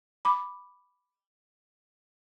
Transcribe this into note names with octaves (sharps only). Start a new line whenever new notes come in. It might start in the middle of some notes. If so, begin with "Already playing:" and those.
B5 D6